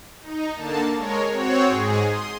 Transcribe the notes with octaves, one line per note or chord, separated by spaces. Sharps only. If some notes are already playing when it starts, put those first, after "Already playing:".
D#4
D3 A#3 A5
G#3 A#4 C#5
C4 F#4 C#5
G#2 G#4
C6 D#6